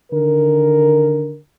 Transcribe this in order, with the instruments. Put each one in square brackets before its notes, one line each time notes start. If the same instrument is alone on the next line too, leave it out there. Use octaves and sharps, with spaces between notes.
[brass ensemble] D3 D#3 A#4